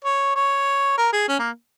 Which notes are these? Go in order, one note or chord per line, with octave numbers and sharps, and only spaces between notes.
C#5
C#5
A#4
G#4
C#4
A#3